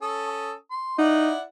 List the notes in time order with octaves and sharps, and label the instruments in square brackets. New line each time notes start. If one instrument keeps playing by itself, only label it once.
[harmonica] C#4 A4 D#6
C6
[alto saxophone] D#4 [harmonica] E4 D5 F#5